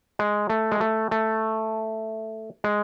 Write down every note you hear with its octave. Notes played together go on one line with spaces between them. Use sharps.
G#3
A3
G#3
A3
A3
G#3